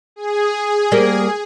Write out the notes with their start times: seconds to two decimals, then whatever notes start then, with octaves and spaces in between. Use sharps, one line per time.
0.16 G#4
0.92 G3 A#3